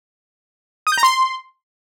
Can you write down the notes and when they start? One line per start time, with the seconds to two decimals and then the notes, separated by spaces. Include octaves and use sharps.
0.87 D#6
0.92 G6
0.98 A#5
1.03 C6